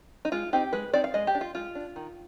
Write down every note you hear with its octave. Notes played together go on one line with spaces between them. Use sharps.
D#4
G#3 F4
C4 D#4 G4
G#3 B4
C4 D#4 D5
F5
G#3 D#5
G4
D4
F4
G#3 F4
D4
D#3